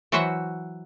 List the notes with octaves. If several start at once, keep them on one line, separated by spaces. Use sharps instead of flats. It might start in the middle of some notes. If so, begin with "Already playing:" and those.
E3 F#3 F#4 C5 E5 F#5